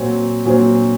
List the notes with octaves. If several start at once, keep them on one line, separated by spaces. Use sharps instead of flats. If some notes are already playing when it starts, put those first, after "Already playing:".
Already playing: A#2 F#3 C4
A#2 F#3 C4